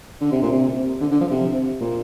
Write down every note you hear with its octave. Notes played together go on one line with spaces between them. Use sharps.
D3
C3
A#2
C3
D3
D3
F3
C3
A#2